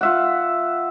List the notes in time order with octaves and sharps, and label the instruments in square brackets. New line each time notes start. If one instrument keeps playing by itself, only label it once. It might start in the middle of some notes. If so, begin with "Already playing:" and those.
[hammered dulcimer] F4 E5 F#5